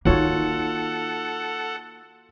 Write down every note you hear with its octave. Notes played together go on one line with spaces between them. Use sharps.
D#3 A#3 D#4 F4 F#4 A4 C#5 F#5